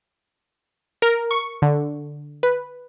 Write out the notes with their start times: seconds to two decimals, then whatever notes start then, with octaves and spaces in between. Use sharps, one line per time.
1.02 A#4
1.31 C#6
1.62 D3
2.43 B4